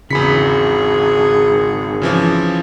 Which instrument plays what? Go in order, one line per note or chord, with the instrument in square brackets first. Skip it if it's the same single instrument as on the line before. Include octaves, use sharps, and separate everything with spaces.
[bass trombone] G#1 [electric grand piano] E2 B5 B6 [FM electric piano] C#3 C#7 [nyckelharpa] G#4
[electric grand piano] C#3 E3 F3